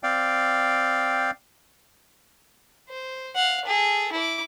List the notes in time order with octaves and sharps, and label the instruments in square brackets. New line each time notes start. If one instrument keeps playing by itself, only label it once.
[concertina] C4 D5 F5 G5
[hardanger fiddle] C5
F5 F#5
G#4 A4
E4 D6